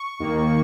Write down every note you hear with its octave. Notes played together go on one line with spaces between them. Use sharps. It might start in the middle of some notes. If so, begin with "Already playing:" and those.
Already playing: C#6
D#2 D#3 A#3